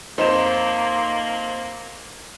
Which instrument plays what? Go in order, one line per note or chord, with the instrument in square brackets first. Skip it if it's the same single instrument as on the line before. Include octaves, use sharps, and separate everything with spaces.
[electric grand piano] F2 D#4 [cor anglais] A#3 [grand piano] C5 D#5 E7